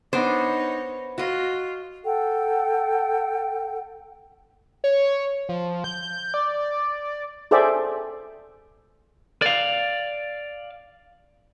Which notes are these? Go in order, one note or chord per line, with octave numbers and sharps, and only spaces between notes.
B3 D4 D#4 C5 C#5
F4 F#4 D#5
A4 F#5 G5
C#5
F3
G6
G6
D5
G#4 A4 C5 D5 E5 G5
D5 F5